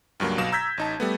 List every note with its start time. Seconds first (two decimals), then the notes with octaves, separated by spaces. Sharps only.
0.20 C#2 G2 F#3 A#3
0.38 B1 B2 F5 A#6 E7
0.52 A#5 E6 G6 G#6 B6
0.78 A1 D#4 A5
1.00 G3 A3 B3